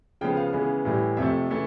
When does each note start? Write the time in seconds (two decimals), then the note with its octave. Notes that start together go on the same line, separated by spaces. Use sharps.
0.21 C#3 F3 G#3 B3 G5
0.37 F5
0.53 C#3 E3 G#3 B3
0.85 A2 E3 G3
1.17 F2 C3 F3 A3 E5
1.50 C#3 E3 A3